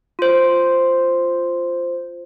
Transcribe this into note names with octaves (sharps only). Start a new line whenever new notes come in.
F4 C5